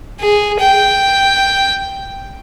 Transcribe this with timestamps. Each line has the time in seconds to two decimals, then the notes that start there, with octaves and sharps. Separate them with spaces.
0.20 G#4
0.60 G5